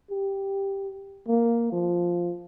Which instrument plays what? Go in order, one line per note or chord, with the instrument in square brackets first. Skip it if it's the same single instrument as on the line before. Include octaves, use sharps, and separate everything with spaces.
[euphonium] G4
A#3
F3